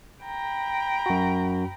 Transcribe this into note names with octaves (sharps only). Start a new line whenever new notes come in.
G5 A#5 B5
F#2 F#4